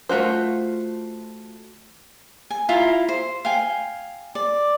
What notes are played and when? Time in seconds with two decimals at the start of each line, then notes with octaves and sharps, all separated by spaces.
0.09 A3 F4 F#4 C5
2.50 G#5
2.69 E4 F4 F5 A#5
3.09 C5
3.45 F5 G5 G#5
4.35 D5